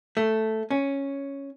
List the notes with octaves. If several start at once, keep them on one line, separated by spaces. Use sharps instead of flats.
A3
C#4